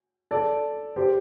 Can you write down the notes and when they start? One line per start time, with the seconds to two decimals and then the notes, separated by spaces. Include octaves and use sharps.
0.31 A4 D5
0.96 G4 C5